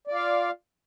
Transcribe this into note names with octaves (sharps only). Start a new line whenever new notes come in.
F4 D5 F5